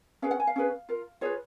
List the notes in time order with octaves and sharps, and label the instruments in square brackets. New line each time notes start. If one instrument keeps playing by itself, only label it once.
[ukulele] C#4 G#4 B4 F5
F#5
G#5
F5
C#4 G#4 B4
F4 A#4
F4 G#4 B4 C#5